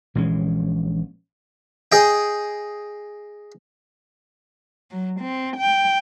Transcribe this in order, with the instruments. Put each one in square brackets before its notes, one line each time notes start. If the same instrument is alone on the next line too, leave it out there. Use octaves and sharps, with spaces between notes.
[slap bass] A#1 E3 G#3 C#4
[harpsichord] G#4 D#5 G5
[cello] F#3
C4
G5